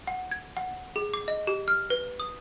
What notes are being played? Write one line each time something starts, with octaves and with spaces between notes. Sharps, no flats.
F#5
G#6
F#5
G#4
D6
D#5
G4
F6
B4
D#6